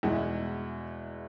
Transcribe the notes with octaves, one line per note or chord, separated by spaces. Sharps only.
E2 B2 G#3 E4